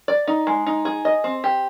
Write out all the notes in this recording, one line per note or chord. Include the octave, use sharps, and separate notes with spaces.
D5
D#4
G#3
D#4
G#4
D#5
C4
G4